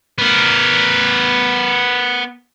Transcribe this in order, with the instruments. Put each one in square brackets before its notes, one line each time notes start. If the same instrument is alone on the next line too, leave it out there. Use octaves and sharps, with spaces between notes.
[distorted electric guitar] B3 A#4